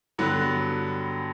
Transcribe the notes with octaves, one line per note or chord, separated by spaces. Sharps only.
G2 D3 F#3 B3